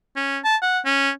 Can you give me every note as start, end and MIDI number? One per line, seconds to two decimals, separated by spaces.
0.16 0.38 61
0.44 0.56 81
0.62 0.79 78
0.85 1.10 61